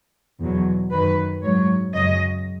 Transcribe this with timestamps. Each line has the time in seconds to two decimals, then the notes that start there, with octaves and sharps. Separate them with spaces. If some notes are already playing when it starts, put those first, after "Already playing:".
0.40 E2 B2 F#3
0.91 F#2 D#3 F#3 B4
1.42 G#2 F#3 C#5
1.94 F#2 C#3 F#3 D#5